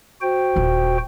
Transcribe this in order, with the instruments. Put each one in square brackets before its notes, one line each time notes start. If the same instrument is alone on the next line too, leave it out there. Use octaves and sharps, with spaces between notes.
[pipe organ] F#4 C5 G5
[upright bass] D#1 F4